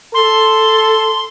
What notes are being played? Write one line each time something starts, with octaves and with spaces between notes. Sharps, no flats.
A4 C6